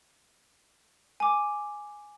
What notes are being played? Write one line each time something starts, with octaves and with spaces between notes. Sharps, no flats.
G#5 D6